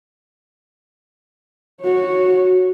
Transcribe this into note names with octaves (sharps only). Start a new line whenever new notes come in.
F#4 C#5